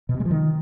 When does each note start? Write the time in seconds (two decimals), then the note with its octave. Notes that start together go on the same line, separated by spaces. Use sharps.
0.09 B2
0.14 C3
0.20 G#3
0.25 F3
0.31 D#3